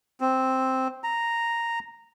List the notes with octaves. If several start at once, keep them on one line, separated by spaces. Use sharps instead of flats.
C4
A#5